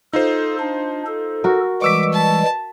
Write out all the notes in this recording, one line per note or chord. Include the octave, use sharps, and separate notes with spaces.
D#4 F4 A4 C5
D4
A4
F#4 A#4
E3 G3 G#3 C#6 D6 E6 B6
A5